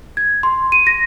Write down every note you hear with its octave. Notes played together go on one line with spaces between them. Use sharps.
G#6
C6
D#7
A#6